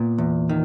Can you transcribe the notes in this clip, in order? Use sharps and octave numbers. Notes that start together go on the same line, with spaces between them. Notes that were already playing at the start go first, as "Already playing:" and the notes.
Already playing: A#2 B3
E2
D#3